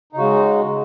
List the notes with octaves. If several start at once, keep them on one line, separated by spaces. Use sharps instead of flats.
C#3 G#3 D#4 F#4